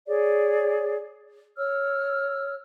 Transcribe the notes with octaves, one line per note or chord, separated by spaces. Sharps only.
G#4 C#5 D5
C#5 E6 F6